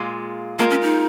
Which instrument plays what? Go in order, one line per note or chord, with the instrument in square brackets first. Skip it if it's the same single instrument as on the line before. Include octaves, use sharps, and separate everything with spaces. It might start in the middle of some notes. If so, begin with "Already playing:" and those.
Already playing: [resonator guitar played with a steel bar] A#2 G#3 F4
[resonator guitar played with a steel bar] G#3 F4 A#4 [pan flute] A#3
[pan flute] C#4
D#4